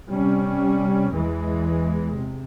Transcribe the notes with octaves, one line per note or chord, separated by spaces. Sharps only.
C3 G3 C#4
E2 E3 G#3
C3